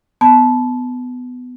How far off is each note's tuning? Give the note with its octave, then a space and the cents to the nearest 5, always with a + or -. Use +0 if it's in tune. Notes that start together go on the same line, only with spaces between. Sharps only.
B3 +15 A5 -20